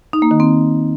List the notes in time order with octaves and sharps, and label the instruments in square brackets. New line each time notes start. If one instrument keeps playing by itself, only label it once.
[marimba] D#4
A#3
D#3
C4